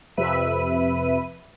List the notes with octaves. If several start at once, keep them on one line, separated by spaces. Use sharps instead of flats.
F2 C3 B4 E5 B5 D#7